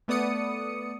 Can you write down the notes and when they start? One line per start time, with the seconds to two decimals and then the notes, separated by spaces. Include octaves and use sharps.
0.08 A3 B3 D5 D#6 C#7